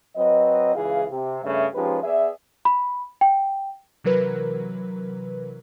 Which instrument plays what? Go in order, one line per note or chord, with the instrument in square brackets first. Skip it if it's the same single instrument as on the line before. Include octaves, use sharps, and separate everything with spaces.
[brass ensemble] F#3 C4 B4 D#5
C#2 E3 E4 G#4 F5
C3
G2 C#3 A3 E5
F3 G#3 C#4 D#4 G4 B4
B3 G#4 B4 D5 E5
[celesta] B5
G5
[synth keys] C3 E3 F#3 A#4 B4